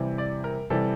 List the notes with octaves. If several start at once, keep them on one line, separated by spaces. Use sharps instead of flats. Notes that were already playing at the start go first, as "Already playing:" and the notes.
Already playing: C3 E3 G3
D5
A#4
C3 E3 G3 A4